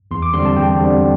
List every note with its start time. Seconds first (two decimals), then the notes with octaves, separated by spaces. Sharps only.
0.11 E2 C6
0.22 D6
0.33 D3 G3 C4 C6
0.45 A5
0.56 E2 G5
0.79 D3 G3 C4